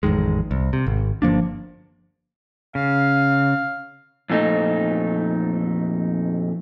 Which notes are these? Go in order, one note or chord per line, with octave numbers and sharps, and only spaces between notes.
A1 F2 D#3 G#3
C2
C3
G#1
G1 F3 A#3 D4
C#3 F5
F2 A#2 A3 D#4